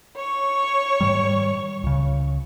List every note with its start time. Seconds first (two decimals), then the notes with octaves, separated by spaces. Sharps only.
0.16 C#5 C#6
1.01 G#2 D#3 G3
1.83 C#2 C#3